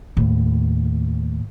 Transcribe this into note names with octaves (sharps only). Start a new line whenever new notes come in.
D#2 A2